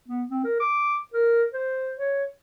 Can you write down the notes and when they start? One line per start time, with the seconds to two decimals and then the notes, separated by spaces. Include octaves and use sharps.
0.08 B3
0.30 C4
0.44 A#4
0.60 D6
1.14 A#4
1.53 C5
1.98 C#5